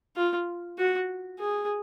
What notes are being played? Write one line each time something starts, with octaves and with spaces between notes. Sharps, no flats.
F4
F#4
G#4